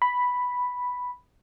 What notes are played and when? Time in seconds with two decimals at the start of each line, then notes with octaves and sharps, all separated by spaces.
0.02 B5